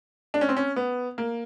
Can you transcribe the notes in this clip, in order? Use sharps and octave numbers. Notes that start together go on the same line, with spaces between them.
D4
C#4
C4
C#4
B3
A#3